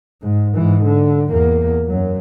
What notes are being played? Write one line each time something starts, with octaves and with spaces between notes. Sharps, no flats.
G#2
G#2 E3
D3
E2 A#3
F#2 F#3